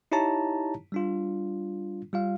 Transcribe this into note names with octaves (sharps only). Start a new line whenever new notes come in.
D#4 E4 G4 C#5 A5 A#5
G3 D4 F4
G3 F4 F5